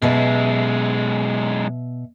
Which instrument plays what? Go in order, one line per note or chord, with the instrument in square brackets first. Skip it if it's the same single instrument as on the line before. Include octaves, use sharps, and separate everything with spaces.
[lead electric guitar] F#2 G#3 [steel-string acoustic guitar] B2 E5